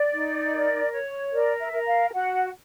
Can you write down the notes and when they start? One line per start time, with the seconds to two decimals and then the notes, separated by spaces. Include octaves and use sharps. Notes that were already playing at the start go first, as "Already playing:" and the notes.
Already playing: D5
0.12 D#4
0.52 A#4
0.93 C#5
1.32 A#4 D5
1.60 E5
1.72 A#4
1.86 F5
2.13 F#4 F#5